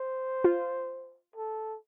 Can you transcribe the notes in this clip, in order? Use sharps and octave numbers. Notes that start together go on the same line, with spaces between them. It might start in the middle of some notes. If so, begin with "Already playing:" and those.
Already playing: C5
F4
A4